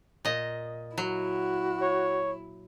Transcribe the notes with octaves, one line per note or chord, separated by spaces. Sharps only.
A#2 D#5
F#3 E4 F#4
C#5